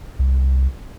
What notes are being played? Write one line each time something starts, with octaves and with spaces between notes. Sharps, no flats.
C2